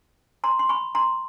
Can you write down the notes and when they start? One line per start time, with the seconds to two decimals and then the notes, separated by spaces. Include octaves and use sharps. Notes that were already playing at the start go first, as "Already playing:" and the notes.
0.44 A#5 C6
0.59 C6
0.69 B5 C#6
0.95 A#5 C6